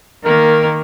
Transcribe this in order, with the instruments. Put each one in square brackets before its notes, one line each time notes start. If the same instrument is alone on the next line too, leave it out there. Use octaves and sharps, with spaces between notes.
[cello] D#3 [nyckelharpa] A#3 [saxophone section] A#4